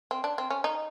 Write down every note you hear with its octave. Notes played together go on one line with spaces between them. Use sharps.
C4
D4
C4
C#4
D#4